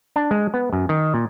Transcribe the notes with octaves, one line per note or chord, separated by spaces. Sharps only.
D4
G#3
B3
F#2
D#3
A#2